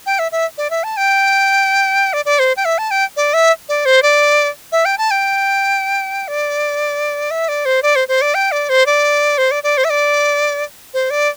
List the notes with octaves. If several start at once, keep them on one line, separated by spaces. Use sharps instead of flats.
G5
E5
E5
D5
E5
A5
G5
D5
D5
C5
G5
E5
A5
G5
D5
E5
D5
C5
D5
E5
G5
A5
G5
D5
E5
D5
C5
D5
C5
C5
D5
G5
D5
C5
D5
C5
D5
D5
C5
E5
D5
C5
D5